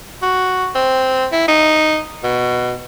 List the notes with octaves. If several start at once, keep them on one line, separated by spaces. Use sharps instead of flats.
F#4
C4
E4
D#4
B2